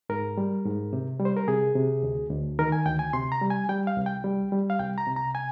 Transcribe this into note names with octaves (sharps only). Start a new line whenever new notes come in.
G#2 A#4
G3
G#2
C3
G3
C5
A#4
C3 G#4
C3
D2
D2
D#3 A#4
G#5
D2 G5
G#5
C3 C6
A#5
G3
G#5
G3 G5
F5
C2
G5
G3
G3
F5
C2 G5
A#5
C3
A#5
G#5